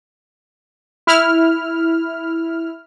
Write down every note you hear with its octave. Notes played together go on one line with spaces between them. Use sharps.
E4 F6